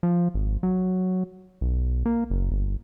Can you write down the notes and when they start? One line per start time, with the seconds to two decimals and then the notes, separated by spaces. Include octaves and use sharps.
0.03 F3
0.34 G#1
0.63 F#3
1.61 B1
2.06 A#3
2.30 F#1
2.51 G1